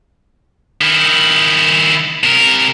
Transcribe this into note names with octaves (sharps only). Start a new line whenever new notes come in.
D#3 E4
C3 A#4